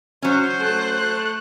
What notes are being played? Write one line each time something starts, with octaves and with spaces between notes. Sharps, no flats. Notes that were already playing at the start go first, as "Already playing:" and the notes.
F#3 C#4 C5
A3 F#6